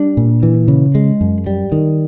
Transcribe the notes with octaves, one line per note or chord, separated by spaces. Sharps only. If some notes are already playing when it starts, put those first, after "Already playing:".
Already playing: G3 D4
A#2
E3
C#3
G#3
F#2
G3
D#3